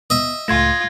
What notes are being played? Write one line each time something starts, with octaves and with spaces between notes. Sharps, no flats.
B3 D#5 E5
C#2 A2 A3 F4 C6 G#6 A#6